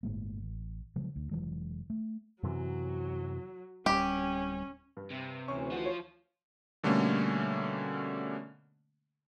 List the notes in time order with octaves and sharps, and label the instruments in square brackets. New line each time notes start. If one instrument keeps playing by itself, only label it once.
[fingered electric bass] G1 A2 G#3 A#3
A1
C#3 F3 F#3 G#3
D2
F1 E3 F#3 G#3
A3
[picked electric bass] F#2 C3 E3 [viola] F#3
[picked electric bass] D1 G3 [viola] C#4 [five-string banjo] G4
[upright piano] G2
[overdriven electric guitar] C3
[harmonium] D2 E3 [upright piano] C#4 C#6
[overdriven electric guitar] F3 F4 [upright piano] F#4
[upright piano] C#5
[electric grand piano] B2 D3 G3 A3 A#3 C#4